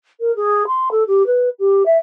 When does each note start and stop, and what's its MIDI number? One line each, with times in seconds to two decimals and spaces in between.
0.20 0.34 70
0.36 0.63 68
0.67 0.89 84
0.91 1.04 69
1.07 1.26 67
1.26 1.49 71
1.59 1.83 67
1.86 1.97 76